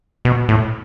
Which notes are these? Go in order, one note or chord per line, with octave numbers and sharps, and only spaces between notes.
B2
A2